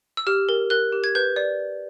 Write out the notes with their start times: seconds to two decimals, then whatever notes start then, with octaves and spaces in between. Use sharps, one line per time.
0.17 E6
0.27 G4 F6
0.49 A#4
0.70 A#4 F#6
0.92 G4
1.04 G#6
1.15 B4 G6
1.36 D5